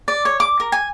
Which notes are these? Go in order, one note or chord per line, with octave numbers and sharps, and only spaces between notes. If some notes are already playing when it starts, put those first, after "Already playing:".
D5
C#5
D6
A#4
G#5